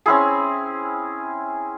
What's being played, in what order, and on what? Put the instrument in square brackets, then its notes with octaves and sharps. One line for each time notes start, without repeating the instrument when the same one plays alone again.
[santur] C4 C#4 E4 G#4